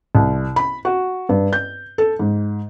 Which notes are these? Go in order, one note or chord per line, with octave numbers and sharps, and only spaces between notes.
C2
B5
F#4
G2
G6
A4
G#2